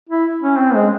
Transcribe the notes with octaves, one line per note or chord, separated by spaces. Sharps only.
E4
C#4
C4
G#3